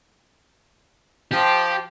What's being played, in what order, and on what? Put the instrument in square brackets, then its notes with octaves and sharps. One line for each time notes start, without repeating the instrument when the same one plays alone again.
[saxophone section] F3 [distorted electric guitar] G4